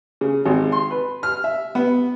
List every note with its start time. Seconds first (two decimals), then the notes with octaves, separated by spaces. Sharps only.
0.21 C#3
0.46 G#1
0.72 C6
0.91 B4
1.23 F6
1.44 E5
1.75 B3